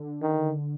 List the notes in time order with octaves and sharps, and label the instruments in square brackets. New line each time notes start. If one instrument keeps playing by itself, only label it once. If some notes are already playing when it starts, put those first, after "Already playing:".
Already playing: [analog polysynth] D3
[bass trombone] D#3